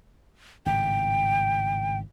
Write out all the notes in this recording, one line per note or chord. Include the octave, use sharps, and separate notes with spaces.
G#1 A2 C#3 G5